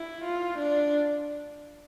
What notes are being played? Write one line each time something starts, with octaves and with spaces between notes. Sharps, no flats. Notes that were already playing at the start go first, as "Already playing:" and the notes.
Already playing: E4
F4
D4